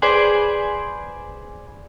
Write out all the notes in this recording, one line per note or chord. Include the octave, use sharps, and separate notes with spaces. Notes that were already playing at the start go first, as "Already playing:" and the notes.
G#4 B4 C5 D5